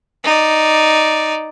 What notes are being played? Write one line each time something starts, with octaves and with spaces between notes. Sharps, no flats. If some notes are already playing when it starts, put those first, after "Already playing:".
D#4 D5